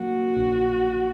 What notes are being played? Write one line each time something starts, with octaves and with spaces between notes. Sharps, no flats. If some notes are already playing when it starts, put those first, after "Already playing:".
Already playing: F#3 A#3 F#4
A#1